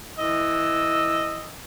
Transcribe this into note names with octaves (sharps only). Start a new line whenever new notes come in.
E3 D#5 E6